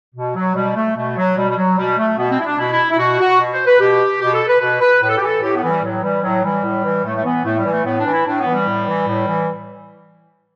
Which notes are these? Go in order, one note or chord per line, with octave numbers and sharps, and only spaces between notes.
B2
F#3
B2 G3
A3
B2 A3
F#3
B2 G3
G3
F#3
B2 G3
A3
B2 B3
C4
E4
D4
B2 E4
E4
E4
B2 F#4
F#4
B2
C5
B4
B2 G4
B2 G4
A4
B4
B2 B4
B4
A2 B4
A4
G4
E3 A4
A2 G4
B3
E3
G3
A2 F#3
E3 G3
A2 F#3
E3 G3
A2
E3
A2 A3
A3
E3 B3
A2 A3
G3
E3
A3
A2 B3
D4
E3
E4
A2 D4
B3
E3
G3
A2
E3
A2
E3